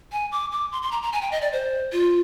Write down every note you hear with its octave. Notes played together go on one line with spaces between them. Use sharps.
G#5
D6
D6
C6
C6
A#5
A#5
G#5
G5
D#5
D5
C5
F4